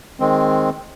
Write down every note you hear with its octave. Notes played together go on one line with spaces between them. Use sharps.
D#3 G#3 C4